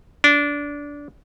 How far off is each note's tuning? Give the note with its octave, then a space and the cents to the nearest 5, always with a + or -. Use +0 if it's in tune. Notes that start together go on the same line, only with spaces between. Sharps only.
D4 -20